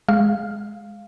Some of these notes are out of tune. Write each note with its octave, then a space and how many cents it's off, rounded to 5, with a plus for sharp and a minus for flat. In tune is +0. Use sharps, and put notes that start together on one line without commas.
G#3 +0 F5 +0